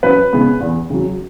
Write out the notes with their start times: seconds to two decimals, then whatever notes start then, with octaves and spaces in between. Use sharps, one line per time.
0.03 F#2 B4
0.33 C#3 G#3 B3
0.61 E2
0.90 C#3 F#3